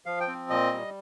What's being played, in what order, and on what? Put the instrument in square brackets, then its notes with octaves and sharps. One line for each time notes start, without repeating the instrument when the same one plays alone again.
[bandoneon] F3 F5
G5
C4
A#2 D#5
G3